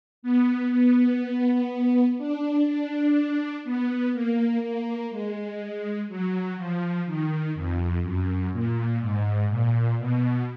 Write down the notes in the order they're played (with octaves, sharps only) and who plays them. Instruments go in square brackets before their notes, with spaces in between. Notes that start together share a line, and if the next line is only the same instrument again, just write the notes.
[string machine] B3
B3
D4
D4
B3
A#3
A#3
G#3
F#3
F3
D#3
F2
F#2
A#2
G#2
A#2
B2